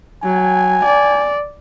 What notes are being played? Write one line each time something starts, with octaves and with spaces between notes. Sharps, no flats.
F#3 G#5
D5